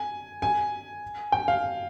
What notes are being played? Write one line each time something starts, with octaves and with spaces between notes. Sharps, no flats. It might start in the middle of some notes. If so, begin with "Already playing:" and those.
Already playing: G#5
G#5
G5
F5